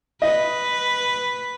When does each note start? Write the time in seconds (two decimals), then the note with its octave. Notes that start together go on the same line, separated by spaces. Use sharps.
0.22 B4 D#5